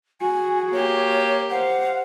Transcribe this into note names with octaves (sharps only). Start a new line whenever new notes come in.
F#4 G#4 G#5
A#3 G4 C#5
C5 F5 F#5